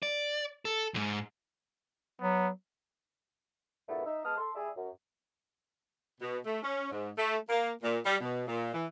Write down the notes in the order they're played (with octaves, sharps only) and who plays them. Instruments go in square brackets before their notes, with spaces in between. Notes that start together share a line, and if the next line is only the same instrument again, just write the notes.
[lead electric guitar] D5
A4
D2 G#2
[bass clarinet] F#3 [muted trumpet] B3
[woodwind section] E2 G2 A#2 A3 B3 E4
D#4 E5
G#3 B3 A5 D#6 F6
A4 C6
G3 E4 G#4 D5 E5
F#2
[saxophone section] B2
A3
C#4
G#2
A3
A#3
A#2
G3
B2
A#2
E3